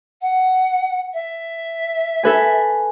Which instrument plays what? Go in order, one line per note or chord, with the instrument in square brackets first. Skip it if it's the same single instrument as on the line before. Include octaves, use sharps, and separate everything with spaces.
[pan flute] F#5
E5
[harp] A4 B4 G#5